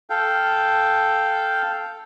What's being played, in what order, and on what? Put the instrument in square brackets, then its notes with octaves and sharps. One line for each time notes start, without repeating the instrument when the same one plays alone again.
[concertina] A4 F5 G5